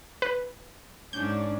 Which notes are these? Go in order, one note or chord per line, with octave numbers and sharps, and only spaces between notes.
B4
G#2 C#4 D4 G6